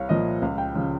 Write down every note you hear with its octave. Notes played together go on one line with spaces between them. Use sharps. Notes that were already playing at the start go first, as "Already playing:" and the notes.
Already playing: C2 C#5 F5
A#2 F3 D#5
C#2 F5
G5
C#3 F3